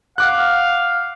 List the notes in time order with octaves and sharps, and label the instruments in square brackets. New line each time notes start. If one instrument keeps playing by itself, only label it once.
[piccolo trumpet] F5 [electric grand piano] F#5 D6 F#6